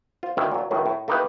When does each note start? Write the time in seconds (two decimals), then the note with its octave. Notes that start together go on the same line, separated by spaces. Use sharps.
0.23 F4 C5
0.37 D2 D3 D#3 E4 F5
0.52 A#2 F#3
0.71 C#2 F#2 A2 D#3 F#3
0.86 A2
1.08 A3 A#3 D#4 E4 G4 B4